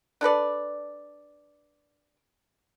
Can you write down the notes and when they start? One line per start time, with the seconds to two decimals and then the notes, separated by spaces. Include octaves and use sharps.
0.21 D4 A4 B4 D5